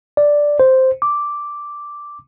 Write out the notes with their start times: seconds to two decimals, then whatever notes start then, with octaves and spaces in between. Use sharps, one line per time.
0.17 D5
0.60 C5
1.02 D6